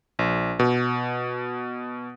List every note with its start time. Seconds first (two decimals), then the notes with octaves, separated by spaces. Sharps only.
0.19 A#1
0.59 B2